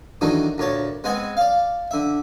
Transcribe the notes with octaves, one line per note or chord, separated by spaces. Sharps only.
D#3 E3 F#3 A3 D4 D#4
D2 A#2 C#5 A5
G#3 B3 C4 G#4 F#5 G#5
D5 F5
D3 E5